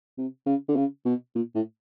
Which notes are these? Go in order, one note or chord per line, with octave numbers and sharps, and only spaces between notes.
C3
C#3
D3
C#3
B2
A#2
A2